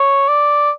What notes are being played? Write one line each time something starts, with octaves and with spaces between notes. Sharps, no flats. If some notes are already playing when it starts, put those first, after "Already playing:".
Already playing: C#5
D5